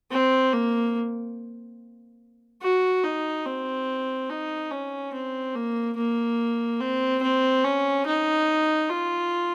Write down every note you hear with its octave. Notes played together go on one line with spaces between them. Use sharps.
C4
A#3
F#4
D#4
C4
D#4
C#4
C4
A#3
A#3
C4
C4
C#4
D#4
F4